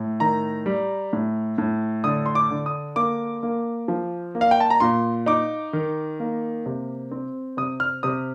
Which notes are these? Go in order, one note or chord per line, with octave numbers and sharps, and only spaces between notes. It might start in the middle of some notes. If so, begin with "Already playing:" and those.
Already playing: A2
D#3 A#5
G3
A2
A2
D3 D#6
C6
D6
D3
D#6
A#3 D6
A#3
F3
A#3
F5
G5
A5
A#5
A#2 C6
D#4 D6
D#3
A#3
C3
C4
C3 D#6
F6
C3 D#6